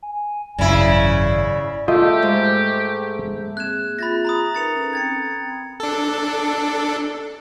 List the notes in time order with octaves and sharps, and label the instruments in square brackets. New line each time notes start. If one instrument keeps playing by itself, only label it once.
[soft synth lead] G#5
[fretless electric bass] G#1 F#2 [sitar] C#3 E4 [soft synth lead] D5
[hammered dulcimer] A3 [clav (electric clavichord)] F4 D#5 [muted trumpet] G4
[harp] G#2
[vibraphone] A#3 C4 G#4 [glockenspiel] F#6 G#6 E7
[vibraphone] F4 G#4 E5 [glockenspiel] B5 A6 A#6
[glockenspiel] A#5 B5 D#6
[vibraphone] D#4 A#4 B4 [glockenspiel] A6 C#7 F7
[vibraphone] C#4 A4
[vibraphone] C4 G5 [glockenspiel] G#6 A6 C#7
[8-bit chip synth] D4 A4